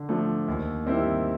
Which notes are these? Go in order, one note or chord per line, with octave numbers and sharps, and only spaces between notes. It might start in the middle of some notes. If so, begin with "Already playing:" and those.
Already playing: D3
F3 A3 D4
D#2
D#3 G3 C4 E4